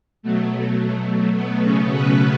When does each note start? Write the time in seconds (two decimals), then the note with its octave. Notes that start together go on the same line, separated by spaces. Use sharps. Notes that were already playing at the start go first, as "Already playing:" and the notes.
0.23 B2 F#3 A3
1.35 B2 B3
1.64 C#3 C#4
1.91 B3 B4